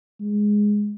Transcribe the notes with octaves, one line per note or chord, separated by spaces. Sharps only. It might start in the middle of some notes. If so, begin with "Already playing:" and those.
G#3